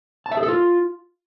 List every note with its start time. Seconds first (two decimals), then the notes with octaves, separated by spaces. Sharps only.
0.26 A5
0.31 E5
0.37 G#4
0.43 A4
0.48 F4